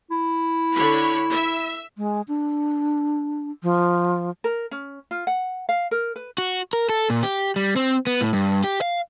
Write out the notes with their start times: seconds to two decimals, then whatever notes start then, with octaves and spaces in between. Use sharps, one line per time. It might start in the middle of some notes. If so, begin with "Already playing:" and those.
0.11 E4
0.73 D3 C#5 B5
1.31 E5
1.98 G#3
2.28 D4
3.63 F3
4.44 A#4
4.71 C#4
5.11 F4
5.27 F#5
5.69 F5
5.91 A#4
6.16 B4
6.38 F#4
6.73 A#4
6.89 A4
7.10 A#2
7.23 G4
7.56 G3
7.76 C4
8.07 B3
8.21 A2
8.33 G2
8.64 G4
8.81 F5